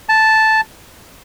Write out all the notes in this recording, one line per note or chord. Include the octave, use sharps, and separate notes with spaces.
A5